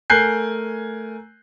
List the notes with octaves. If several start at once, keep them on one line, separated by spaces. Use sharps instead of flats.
A3 A#4 G#5 F#6 G6 C7